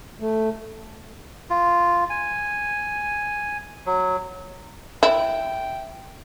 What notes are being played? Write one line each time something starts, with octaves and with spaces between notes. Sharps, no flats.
A3
F4
G#5
F#3
E4 E5 G5